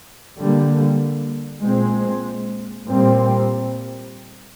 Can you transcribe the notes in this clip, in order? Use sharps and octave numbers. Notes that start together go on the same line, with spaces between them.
D3 G3 A#3
A#2 G#3 C4
A#2 G3 C4